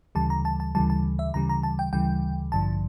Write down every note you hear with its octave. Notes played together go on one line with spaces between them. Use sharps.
D2 C#3 E3 G3 A5
A#5
A5
A5
D2 C#3 E3 G3 A5
A5
E5
D2 C#3 E3 G3 A#5
A#5
A5
G5
D2 C#3 E3 G3 G5
A1 G2 D3 F3 A5